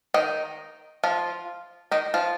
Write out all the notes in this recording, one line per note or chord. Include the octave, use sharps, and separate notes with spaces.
D#3 D#4
F3 F4
D#3 D#4
F3 F4